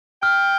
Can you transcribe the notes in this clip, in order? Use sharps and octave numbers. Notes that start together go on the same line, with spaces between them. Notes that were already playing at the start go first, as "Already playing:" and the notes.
G5 F6